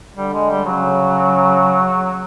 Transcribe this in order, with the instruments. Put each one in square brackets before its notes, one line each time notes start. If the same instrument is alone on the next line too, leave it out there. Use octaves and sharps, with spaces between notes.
[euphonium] D3 [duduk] G3
[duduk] G#3
G3
[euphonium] C#3 [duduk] F#3